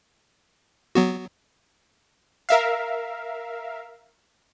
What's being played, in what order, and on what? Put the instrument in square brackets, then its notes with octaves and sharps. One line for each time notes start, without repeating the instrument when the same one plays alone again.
[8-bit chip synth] F#3 B3 F#4
[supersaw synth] A#4 E5 F5